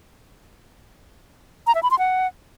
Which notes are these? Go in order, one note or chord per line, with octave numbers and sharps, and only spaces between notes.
A#5
E5
B5
C6
F#5